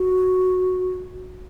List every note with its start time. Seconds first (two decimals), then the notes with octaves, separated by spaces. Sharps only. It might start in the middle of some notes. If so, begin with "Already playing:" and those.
Already playing: F#4